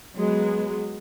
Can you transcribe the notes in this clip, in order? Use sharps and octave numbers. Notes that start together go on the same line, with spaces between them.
F#3 G#3 B3